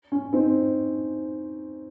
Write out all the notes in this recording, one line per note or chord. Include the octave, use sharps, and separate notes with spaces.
C#4
C4 D#4